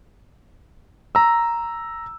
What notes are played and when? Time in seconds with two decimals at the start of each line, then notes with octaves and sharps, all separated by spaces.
1.15 A#5 E6